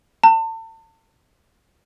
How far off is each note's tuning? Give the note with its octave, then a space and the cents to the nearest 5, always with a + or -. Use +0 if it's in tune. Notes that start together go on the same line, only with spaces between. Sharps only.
A5 +35